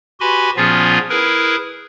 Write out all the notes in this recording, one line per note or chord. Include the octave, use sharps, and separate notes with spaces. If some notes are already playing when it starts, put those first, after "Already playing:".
F#4 G4 B4 G#5 B5 C6
A#2 F3 B3 C#4 F4 G#4
E4 G#4 A#4 B4